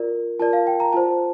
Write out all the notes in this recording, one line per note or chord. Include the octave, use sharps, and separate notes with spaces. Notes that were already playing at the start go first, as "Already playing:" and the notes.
Already playing: F4 A#4 D5
F4 A#4 D5 A5
F5
G5
A#5
F4 C5 A5